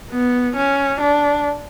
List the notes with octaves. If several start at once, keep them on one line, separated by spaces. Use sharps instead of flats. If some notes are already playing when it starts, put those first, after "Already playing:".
B3
C#4
D4